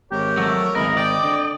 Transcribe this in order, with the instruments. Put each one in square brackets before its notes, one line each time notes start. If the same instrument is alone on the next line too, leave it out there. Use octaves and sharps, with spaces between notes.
[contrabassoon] G#1 [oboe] G4 [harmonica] A#4 C#5
[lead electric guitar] F#3 A3
[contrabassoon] G#1 [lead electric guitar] D2 A#4 [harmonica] E3 B4 [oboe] D#5
[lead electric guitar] D5 [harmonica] G5 D6
[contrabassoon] D3